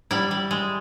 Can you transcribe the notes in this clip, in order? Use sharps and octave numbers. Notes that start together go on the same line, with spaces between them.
G3 E4
G3
G#3